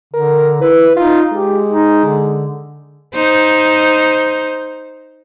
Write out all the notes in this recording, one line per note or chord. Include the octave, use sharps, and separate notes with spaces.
D3 A#4
E4 B4
D#4 F4
G#3 G4
D#4
D3
D#4 C5